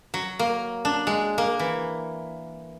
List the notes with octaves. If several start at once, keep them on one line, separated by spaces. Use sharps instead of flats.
F#3
A#3
D4
G#3
A#3
E3